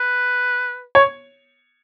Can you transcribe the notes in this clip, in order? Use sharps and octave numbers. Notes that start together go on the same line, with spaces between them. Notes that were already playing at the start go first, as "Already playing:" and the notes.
Already playing: B4
C#5